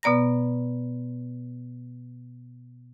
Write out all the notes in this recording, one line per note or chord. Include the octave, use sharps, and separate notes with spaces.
B2 B3 D5 A#5 A#6